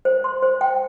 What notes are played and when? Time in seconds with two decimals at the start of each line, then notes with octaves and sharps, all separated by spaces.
0.05 C5
0.24 C6
0.42 C5
0.61 G5